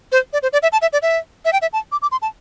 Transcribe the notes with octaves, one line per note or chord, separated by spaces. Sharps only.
C5
D5
C5
D5
E5
A5
E5
D5
E5
E5
G5
E5
A5
D6
D6
C6
A5